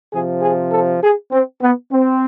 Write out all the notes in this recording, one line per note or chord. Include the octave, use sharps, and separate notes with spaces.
C3 F3 G#4
G#4
A4
G#4
C4
B3
C4